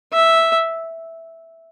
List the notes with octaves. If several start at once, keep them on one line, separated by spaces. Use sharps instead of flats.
E5